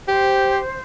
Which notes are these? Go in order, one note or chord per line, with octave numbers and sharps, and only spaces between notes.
G4 C5